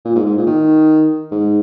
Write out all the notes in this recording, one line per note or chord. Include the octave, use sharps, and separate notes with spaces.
A#2
G#2
G#2
A#2
D#3
G#2